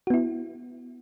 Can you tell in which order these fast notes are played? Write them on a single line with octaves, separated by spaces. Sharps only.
F#4 B3 E4